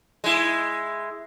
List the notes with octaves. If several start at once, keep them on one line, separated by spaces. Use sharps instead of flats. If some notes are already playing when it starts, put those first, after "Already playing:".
G#3 E4